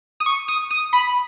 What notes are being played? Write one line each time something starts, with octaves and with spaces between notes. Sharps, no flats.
D#6
C#6
D#6
D#6
B5